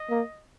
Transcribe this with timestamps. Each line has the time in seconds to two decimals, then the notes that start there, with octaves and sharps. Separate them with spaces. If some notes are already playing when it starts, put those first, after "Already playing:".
Already playing: D#5
0.10 A#3